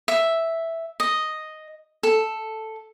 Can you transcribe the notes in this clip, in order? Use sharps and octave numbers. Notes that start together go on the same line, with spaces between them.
E5
D#5
A4